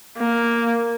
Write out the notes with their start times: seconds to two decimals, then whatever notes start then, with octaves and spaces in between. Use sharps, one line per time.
0.18 A#3